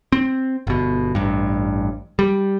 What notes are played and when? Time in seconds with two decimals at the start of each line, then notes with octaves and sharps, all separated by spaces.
0.12 C4
0.67 G1 B2
1.15 A1 G2
2.19 G3